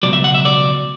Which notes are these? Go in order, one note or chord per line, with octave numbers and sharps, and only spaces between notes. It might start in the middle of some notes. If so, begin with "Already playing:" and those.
C#2 B2 F#3 D5
E5
F#5
E5
D5